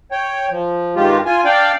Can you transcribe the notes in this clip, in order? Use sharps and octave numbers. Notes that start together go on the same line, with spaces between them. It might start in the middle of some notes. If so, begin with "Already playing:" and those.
C#5 G5
F3
G2 D#3 G#3 F4 G4
F4 G#5
D4 D5 F5 G5